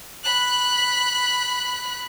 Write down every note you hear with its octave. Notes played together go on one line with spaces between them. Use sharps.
B5 F#6